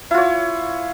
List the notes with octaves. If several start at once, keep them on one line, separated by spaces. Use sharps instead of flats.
E4 F4 C#5